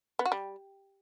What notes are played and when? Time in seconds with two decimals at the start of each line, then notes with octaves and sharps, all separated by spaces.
0.19 B3
0.25 F#4
0.32 G3